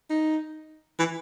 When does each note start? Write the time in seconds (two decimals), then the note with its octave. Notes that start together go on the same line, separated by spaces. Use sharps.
0.10 D#4
0.99 E3